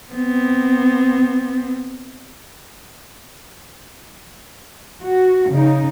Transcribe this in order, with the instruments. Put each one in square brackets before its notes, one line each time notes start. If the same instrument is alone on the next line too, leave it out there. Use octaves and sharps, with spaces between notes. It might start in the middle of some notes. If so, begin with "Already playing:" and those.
[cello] B3 C4
[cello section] F#4
C#3 D#4